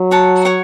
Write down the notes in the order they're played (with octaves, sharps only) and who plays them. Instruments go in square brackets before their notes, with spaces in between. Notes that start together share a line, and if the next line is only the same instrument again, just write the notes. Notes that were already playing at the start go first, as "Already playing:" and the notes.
Already playing: [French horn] F#3
[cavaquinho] F#4 C#5 F#5 A5
C#5 F#5 C#6